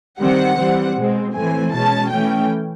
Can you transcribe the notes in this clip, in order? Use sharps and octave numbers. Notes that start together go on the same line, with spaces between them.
D#3 G3 C4 F#5
E3 G3 C4
B2 G#3 C4
A2 E3 A3 C4 G#5
B2 G#3 C#4 A5
E3 A3 C#4 G5